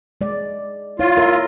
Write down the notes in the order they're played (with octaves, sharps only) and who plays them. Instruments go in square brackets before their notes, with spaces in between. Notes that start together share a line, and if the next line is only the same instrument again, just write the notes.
[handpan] G#3 D5
[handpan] E4 C#5 [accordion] F4
[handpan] A#4 E5